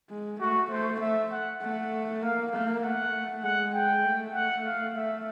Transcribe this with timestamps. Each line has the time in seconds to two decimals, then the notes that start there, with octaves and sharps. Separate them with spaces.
0.10 G#3
0.41 A3 F#4
0.71 A3 C5
1.01 A3 E5
1.32 F#5
1.62 A3 F#5
2.22 A#3 F5
2.53 A#3 F5
2.83 A3 F#5
3.44 G#3 F#5
3.74 G5
4.04 A3
4.34 F#5
4.65 F5
4.95 A3 E5